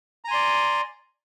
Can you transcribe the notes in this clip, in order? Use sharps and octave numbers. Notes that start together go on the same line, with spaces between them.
D5 G#5 A#5 C6